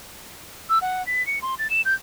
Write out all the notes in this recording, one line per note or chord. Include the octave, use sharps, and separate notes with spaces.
E6
F#5
B6
C#7
C6
A6
E7
G6